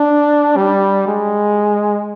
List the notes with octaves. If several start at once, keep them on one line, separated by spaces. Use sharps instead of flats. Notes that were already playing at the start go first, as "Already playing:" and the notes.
Already playing: D4
G3
G#3